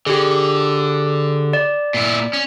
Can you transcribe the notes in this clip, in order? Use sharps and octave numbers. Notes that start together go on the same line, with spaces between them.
D3 G4 G#4
D5
A#2 E4
C#4